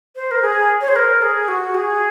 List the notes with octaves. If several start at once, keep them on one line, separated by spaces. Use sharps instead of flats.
C5
A#4
G#4
C#5
C5
A#4
G#4
F#4
G#4